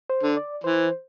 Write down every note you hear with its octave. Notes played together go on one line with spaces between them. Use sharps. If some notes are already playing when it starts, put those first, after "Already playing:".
C5
D3
D5
E3 C5